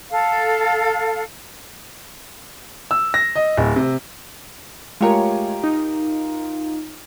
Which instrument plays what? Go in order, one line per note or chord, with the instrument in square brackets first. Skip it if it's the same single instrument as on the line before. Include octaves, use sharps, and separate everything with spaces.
[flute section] A4 F5
[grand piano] E6
A#6
D#5
D1
C3
[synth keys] G#3 A3 C#5 [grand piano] F4 G4 A#4
[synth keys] D#4